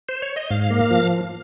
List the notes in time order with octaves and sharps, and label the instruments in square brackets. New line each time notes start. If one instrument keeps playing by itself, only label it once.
[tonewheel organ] C5
C#5
D#5
G#2 F5
A#3
F3